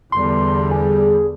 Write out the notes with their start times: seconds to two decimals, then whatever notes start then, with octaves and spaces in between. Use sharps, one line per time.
0.12 E2 D3 G3 C6
0.71 G#4